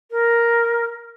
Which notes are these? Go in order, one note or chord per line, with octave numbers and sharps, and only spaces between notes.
A#4